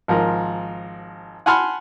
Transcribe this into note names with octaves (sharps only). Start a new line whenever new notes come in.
G#1 F3 A#4
F#5 G#5 A5 B5 C6 F6